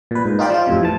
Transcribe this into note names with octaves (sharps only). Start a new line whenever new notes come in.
A#2 B4
G#2
D#4 F4 G4 D5
F3 F4
F2 A2 C3
A2 E3 A5